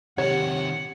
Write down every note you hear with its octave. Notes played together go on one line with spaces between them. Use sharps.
C3 D#3 G4 C#5 F#5